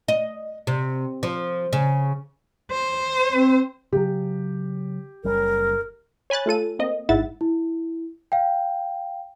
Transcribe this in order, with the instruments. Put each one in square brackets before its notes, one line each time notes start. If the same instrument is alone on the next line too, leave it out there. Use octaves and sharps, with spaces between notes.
[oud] D#5
C3
F3
C#3
[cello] C5
[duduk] C4
[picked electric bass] C#3 F#3 [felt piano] G4
[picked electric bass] F#1 G3 C#4 [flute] A#4
[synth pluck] C#5 G#5 B5 F#6 A6
A3 F4 A4 D#7
A#3 C4 D#5
G#1 G#2 E4 E5 F#5 A6
[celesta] E4
F5 G5